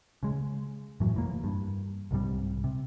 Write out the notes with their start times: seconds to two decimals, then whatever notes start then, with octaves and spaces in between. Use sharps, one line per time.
0.23 C#3 G#3
1.00 F#2 A2 E3 F#3
1.14 F1 E3 A#3
1.44 G2
2.11 C2 G#2 C3 G3
2.64 C3